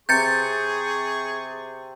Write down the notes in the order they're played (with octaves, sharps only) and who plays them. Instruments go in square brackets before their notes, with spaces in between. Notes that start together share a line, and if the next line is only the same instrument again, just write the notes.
[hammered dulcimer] C3 [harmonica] G#4 C#6 [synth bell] G6 A6 C#7